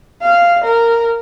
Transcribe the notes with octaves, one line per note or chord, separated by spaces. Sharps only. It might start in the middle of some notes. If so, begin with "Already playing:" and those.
F5
A#4